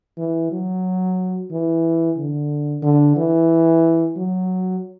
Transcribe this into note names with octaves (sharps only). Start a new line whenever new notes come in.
E3
F#3
E3
D3
D3
E3
F#3